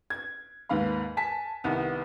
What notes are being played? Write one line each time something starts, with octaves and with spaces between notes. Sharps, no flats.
G#6
D#2 G#2 B4 F5 B5
G#5 A5 B6
C2 D#3 B3